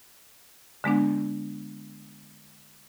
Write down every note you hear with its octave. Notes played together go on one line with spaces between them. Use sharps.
D3 G#3 B3 D4